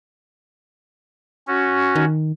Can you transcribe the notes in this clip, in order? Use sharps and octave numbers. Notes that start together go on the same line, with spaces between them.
C#4 F#4
D#3